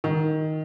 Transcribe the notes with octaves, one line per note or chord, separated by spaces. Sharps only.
D#3